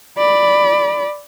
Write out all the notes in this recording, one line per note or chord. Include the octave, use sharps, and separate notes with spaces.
D5 B5